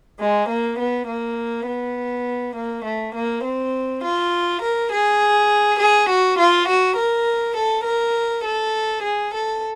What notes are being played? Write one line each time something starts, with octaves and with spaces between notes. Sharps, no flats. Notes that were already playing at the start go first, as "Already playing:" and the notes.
G#3
A#3
B3
A#3
B3
A#3
A3
A#3
C4
F4
A#4
G#4
G#4
F#4
F4
F#4
A#4
A4
A#4
A4
G#4
A4